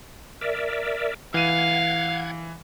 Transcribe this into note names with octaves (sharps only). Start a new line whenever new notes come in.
A#4 D5 E5
E3 F5 F#5 G#6 D#7